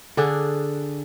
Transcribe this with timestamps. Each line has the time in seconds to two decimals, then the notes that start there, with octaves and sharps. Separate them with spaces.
0.17 D3 D4 G#4